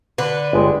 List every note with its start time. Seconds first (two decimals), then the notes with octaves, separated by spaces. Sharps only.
0.18 D3 B4
0.53 G1 G#3 G4